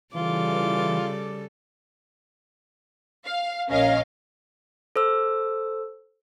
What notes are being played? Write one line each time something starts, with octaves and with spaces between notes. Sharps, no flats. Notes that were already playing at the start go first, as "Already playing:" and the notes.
C#3 E3 G3 F4 A4 D6
F5
A#1 C#4 A#4 D#5 F5
A4 C5 E6